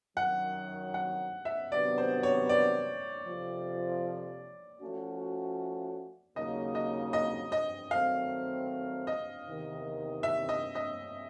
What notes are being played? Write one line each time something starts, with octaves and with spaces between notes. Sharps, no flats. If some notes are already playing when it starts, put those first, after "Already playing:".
F#2 D#3 F#3 F#5
F#5
E5
C3 D#3 F#3 B3 D4 D5
C5
C#5
D5
F2 C3 F3
F3 A3 C#4 F#4
D#2 C#3 F#3 A#3 D#4 D#5
D#5
D#5
D#5
D#3 F#3 A3 C4 F5
D#5
E2 C3 D#3
E5
D#5
D#5